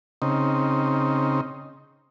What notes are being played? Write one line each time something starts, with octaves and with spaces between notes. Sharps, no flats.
C#3 C4 D#4